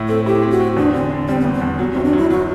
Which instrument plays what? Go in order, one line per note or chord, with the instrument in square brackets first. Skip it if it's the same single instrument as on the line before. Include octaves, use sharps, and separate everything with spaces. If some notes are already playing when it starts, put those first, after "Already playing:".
Already playing: [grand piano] A2 E4
[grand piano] C4 [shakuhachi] A4
[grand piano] E4 [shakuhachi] G4
[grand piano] C4
[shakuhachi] F#4
[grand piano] C4
[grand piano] E2 [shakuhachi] D4
[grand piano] D3 [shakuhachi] C4
[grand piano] D3
[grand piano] G3 [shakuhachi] C4
[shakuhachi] B3
[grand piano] E2
[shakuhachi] C4
[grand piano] E2
[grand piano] F#3 [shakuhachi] B3
[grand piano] G1 [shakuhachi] C4
[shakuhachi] D4
[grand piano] F#3 [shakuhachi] E4
[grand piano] F#3 [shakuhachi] F#4